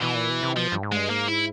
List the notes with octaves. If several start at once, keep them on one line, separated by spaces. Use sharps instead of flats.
B2 E3
A#2
B2
C3
B2 F3
G2
G#2
G2 G#3
G#2 A#3
E4